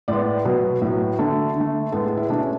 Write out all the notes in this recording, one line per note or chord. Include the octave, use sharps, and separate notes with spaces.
A2 G#3 B3 D5
B2 F#3 B3 B4
A2 F#3 B3
D3 A3 A4
D3 A3
A2 G#3 B3 A4
G#4
E4
B2 A3 D4
C#4